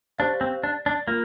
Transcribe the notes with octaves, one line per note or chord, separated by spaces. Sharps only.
D4 G4 C5 F5
C4
D4
D4
A#3 F4